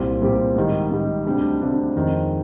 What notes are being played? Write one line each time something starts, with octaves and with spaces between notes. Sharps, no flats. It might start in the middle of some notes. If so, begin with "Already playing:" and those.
Already playing: C2 A#2 G3 C4 G4
C2 A#2 G3 C4 G4
G#2 D#3 G3
G#2 D#3 G3
D2 C3 G3 D4
D2 C3 G3 D4
F2 D#3 G#3 C4 D#4